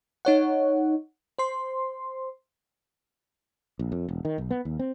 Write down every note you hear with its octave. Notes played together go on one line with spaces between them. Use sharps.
D#4 C#5 F#5
C5 C6
A#1
F2
E1
D#3
B1
B3
D#2
C4